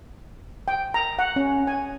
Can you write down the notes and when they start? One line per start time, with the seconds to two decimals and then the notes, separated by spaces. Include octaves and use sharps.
0.68 G5
0.94 A#5
1.19 F#5
1.36 C#4
1.67 G#5